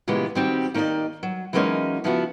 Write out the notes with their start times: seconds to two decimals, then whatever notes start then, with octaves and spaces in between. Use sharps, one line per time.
0.08 A#2 C#3 E3 G#3 B3 G4
0.35 D#3 G3 C4 F#4 G4
0.74 D#3 A#3 G4 G#4 D5 D#5
1.23 F#3
1.53 E3 F#3 G#3 A#3 C#4 D#4
2.04 C#3 F3 B3 E4 F#4